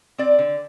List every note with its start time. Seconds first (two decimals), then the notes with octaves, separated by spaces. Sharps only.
0.18 C4 D5
0.39 D3